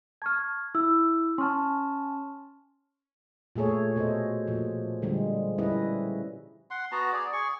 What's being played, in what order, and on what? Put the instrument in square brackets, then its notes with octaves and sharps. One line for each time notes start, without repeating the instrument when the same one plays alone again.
[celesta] A5 C#6 F6 [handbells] G#6
[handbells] E4 [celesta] E6
[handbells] C#4 A5 [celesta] C6 C#6 F6
[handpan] A#2 A3 G#4 A4 C#5
B2 A4 C5 D#5
A#2 F3
D3 F3 G3 G#3
G3 C#4 E4 B4 D#5
[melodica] F#5 C6
B3 F#4 A5 A#5
G#4 D5
G#4 C#6